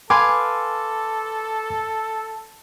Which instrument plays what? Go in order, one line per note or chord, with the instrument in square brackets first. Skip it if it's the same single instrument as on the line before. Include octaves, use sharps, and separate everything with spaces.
[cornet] A4 [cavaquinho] B4 F5 G#5 [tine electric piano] C6 D6